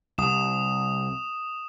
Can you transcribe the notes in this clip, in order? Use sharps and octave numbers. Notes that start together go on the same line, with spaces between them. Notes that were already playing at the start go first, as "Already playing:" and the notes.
C2 D#6 E7